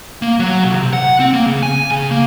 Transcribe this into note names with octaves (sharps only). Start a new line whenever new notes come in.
A#3
F#3
B1
C3
F#5
C4
A#3
C#3
G#5
C#3
A#3